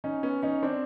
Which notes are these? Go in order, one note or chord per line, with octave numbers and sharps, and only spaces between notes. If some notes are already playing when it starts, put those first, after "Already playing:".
C#4 D#4
B3 C#4
C#4 D#4
C4 D4